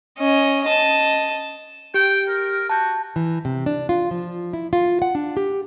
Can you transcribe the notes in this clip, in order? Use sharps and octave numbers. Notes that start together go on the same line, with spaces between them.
C#4 D#5
D#5 A5
G4 G5
A#4
F#4 A5 G6
E3
C3
D4
F4
F3
E4
F4
F#5
D4
G4